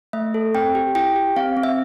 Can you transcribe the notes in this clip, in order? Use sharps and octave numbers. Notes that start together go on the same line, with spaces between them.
A3 E5
A4
C4 G5
G4
E4 G5
G4
C4 F5
C4
E5